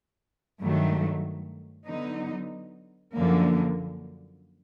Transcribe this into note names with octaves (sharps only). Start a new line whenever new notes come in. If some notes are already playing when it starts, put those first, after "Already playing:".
G2 D#3 F#3 A3
D3 F#3 B3 D#4
F#2 D3 F3 A#3